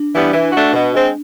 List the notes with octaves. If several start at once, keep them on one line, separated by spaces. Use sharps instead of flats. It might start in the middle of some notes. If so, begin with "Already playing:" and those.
Already playing: D4
E3 G3 B3
E3
A3 D4 F#4
B2
G#3 C4